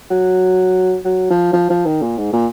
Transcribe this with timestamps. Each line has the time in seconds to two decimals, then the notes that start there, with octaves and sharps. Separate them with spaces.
0.10 F#3
1.05 F#3
1.30 F3
1.53 F3
1.70 F3
1.86 D#3
2.02 A#2
2.18 G#2
2.33 A#2